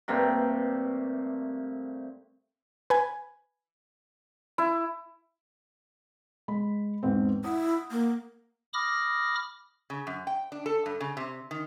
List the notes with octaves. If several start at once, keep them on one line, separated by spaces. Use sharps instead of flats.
G2 C3 A3 A#3
B4 G#5
E4
G#3 B5
E2 G#2 C4
E4 F#5 D#6
A#3
B5 D6 D#6 F6 A#6
C#3
F#2
G5
D4
A4
G2
C#3
C3
D#3